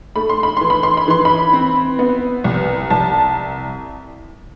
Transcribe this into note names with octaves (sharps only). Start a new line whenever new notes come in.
A3 B5
C6
B5
E3 C6
B5
C6
B5
E3 C6
B5
C4
B3
C2
C2 A5